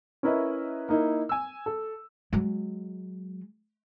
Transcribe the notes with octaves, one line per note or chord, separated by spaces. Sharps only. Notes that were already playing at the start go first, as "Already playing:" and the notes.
C#4 E4 A#4 B4 D#5 E5
A#3 D#4 E4
G#5 E6
A4
F#3 G#3